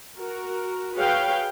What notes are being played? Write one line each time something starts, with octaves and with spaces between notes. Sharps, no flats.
F#4 A#4
F#4 G#4 B4 C#5 F5 G5